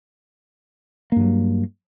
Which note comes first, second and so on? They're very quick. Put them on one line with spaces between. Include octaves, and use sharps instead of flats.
A#3 G2 F#3